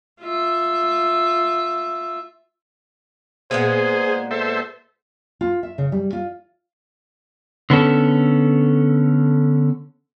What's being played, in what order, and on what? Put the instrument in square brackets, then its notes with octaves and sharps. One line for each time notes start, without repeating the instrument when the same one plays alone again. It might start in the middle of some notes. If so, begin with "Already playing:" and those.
[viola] F4 E5
[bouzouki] A#2 G#3 B3 [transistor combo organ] G#4 [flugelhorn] C5
[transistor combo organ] A4 C5 E5
[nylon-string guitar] F4
E5
C#3
G3
F4
[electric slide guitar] D3 B3 C#4 A4